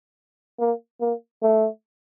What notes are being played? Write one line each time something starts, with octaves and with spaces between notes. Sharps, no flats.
A#3
A#3
A3